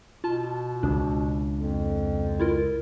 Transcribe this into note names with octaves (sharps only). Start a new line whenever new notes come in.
B2 F4 A5
C#2 D4
F2
E4 F4 A#4